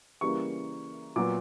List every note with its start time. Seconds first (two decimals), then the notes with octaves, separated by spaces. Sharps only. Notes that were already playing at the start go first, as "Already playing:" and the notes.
0.21 C#3 E3 G3 A#3 C#6
1.16 A#2 F#3 B3 D6